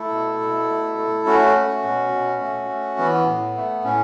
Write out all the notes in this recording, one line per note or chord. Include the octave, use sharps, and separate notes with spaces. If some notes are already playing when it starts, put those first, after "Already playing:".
Already playing: A3 E4 A4
B2
B2
A3
A3
A3 C#4 F#4
A3
B2
B2
A3
A3
E3 B3
A2
A3
A2 C#4